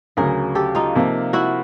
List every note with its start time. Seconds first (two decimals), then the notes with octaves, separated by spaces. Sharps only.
0.17 D2 C#3 F#3 G#4 A#4
0.55 G4 A4
0.75 D#4 F4
0.95 C3 F3 A#3
1.33 E4 F#4